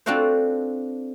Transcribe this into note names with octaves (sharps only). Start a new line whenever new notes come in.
C4 D4 F4 F#4 A4 C5